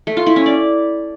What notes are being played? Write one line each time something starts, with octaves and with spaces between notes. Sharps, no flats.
A3
F4
E4
C#4
D5